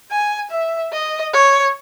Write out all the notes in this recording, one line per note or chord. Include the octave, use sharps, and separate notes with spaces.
G#5
E5
D#5
C#5